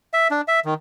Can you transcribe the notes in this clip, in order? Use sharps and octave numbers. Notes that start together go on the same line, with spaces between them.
E5
D4
E5
D#3